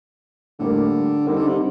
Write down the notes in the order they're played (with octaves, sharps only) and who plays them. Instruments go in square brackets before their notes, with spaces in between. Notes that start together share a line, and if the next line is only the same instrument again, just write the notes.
[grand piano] A2 G3 A#3 [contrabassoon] D3
[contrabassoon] D#3 [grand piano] G3 C4 D#4
[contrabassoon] D3
C3